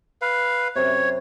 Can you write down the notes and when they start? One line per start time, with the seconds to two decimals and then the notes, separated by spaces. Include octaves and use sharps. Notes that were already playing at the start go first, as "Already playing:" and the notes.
0.21 B4 F5
0.76 F#2 C3 C#5